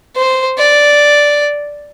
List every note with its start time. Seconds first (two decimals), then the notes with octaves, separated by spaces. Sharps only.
0.16 C5
0.58 D5